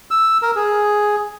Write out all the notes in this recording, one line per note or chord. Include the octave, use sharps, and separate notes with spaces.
E6
A#4
G#4